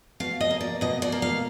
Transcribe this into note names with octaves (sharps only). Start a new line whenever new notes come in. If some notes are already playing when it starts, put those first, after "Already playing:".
B2 F5
D#5
A#3
D5
B2 D#5
D5
A#3
F5